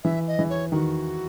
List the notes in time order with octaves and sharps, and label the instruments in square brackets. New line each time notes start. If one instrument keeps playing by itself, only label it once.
[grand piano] E3 [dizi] E5
[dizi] D#5
[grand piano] E3
[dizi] C#5
[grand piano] D#3 [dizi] F#4